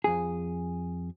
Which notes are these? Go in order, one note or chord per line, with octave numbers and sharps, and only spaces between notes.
F2 G#4